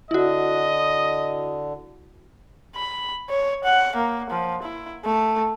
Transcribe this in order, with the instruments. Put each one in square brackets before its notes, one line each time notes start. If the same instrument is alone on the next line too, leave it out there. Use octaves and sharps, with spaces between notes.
[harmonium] D3 [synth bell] E4 F#4 [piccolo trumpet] D#5
[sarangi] B5
C#5
F#5
A#3
F3
E4
A3